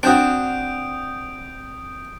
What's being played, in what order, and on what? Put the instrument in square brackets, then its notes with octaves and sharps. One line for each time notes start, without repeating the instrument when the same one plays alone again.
[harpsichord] C4 [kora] D4 F#4 [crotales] D#6 G6 D7